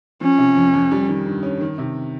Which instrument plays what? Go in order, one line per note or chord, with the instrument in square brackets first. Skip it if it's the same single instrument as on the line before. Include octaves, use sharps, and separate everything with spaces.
[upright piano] F3 [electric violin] C#4
[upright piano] C3
F2
F2
G3
D#3
G2
C#4
D#3
C3